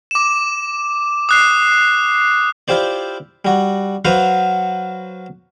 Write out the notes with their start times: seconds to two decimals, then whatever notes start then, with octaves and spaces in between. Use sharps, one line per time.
0.11 D6 E7
1.29 D#6 F#6 C7
2.68 E4 F4 G4 C5 D5
3.45 G3 F#4
4.05 F#3 F#4 B4 C5 F5 F#5